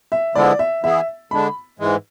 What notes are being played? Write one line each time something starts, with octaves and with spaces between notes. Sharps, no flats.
E5
D3 F3 G#3 B3 E4 D5
E5
E3 B3 E4 G#4 E5
D3 G#3 D4 B5
G#2 E3 G#3